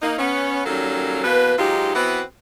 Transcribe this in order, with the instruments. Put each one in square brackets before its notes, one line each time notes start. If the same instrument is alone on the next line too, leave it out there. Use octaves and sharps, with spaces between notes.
[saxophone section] A#3 D#4
B3 C#4
D#3 F#3 G3 A#3 C#4 A4
E2 B2 A#3 B4
G#2 F#3 D#4 F4 G4
E3 B3 C4 E4 F#4 B4